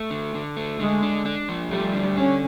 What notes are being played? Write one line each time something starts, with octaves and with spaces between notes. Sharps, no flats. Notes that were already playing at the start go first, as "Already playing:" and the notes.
Already playing: A3
D3
D3
A3
D3 G#3
D4
D4
F3
G3 A3
D3
C#4 D4